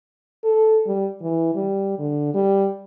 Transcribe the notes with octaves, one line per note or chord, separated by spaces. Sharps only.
A4
G3
E3
G3
D3
G3